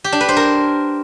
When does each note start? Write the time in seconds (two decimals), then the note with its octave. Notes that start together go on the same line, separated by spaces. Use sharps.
0.04 G4
0.12 D4
0.21 B4
0.29 C5
0.37 A#4